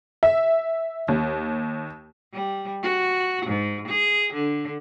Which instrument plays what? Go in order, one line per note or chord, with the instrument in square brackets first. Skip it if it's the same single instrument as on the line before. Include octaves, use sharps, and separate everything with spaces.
[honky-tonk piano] E5
D#2
[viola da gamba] G3
F#4
G#2
G#4
D3